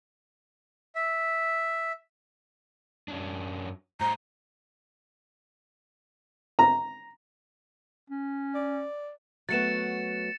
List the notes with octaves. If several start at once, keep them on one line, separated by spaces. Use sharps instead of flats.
E5
F#2 C#4 D4
A2 C5 A#5
A#5
C#4
D5
F#3 A3 B3 A6 C#7 E7